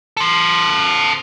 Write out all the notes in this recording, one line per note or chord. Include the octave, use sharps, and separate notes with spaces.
A4 C5